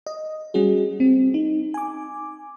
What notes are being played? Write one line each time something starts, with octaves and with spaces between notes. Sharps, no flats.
D#5
G3 C#4 F#4 G#4
C4
D#4
G#5 D6